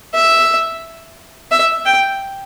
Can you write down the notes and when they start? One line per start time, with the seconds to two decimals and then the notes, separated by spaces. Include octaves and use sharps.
0.14 E5
1.51 E5
1.85 G5